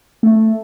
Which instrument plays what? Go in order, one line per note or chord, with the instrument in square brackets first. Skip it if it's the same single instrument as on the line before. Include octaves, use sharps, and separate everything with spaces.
[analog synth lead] A3